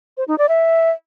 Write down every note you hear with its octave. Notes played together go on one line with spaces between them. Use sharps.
C5
D#4
D5
E5